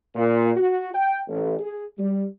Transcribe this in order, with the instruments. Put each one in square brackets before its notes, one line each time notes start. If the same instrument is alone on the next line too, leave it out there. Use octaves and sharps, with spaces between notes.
[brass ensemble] A#2
F#4
G5
A1
G#4
G3